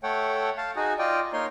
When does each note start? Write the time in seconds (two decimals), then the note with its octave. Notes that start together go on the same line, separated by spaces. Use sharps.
0.03 A3 A4 C#5 F#5 G5
0.58 F5 A5
0.76 D#4 F#4 G#4
0.99 F4 D5 D#5 G5
1.33 A#3 D#4 C#5 C6